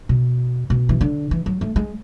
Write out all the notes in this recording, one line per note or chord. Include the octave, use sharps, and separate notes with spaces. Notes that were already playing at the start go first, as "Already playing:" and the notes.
B2
B2
E3
D3
E3
F#3
A3
G#3